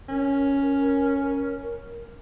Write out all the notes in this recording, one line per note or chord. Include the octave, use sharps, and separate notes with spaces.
C#4 A#4